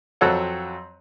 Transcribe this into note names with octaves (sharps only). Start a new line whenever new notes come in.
F2 F#3 C4 A4 C#5 F#5